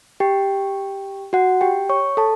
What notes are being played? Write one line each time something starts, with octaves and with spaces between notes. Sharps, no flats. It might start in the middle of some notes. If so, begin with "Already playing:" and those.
G4 G5
F#4 F#5
G4 G5
C#5 C#6
A4 A5